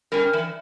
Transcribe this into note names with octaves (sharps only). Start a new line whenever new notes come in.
G3 C#4 A#4
E3